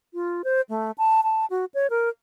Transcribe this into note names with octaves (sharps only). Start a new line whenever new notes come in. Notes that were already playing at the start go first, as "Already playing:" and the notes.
F4
C5
A3
A5
A5
F#4
C#5
A#4